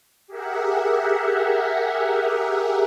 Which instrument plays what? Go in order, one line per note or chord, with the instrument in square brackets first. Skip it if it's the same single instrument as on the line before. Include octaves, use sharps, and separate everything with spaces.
[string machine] G4 G#4 A#4 E5 F#5